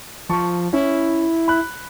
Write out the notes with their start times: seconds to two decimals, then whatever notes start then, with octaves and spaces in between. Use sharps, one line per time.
0.30 F3 A5 C#6
0.73 C#4 E4
1.48 B5 F#6